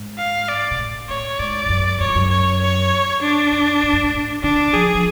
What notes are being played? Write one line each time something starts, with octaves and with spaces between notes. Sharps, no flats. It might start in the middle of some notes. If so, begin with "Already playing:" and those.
Already playing: G#2
F5
D5
B2
A2
A2 C#5
G#2 D5
F2
F#2
F#2 C#5
F2
F#2
C#5
C#5
D4
F#2
G#2
F#2
G#2
A2
C#3 D4
F3 G#4
F3